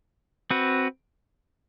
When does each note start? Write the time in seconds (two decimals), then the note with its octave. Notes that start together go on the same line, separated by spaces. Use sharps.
0.50 C4 F#4 B4